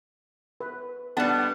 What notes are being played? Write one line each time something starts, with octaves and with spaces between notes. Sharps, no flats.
B4
G3 B3 D4 F#5 A5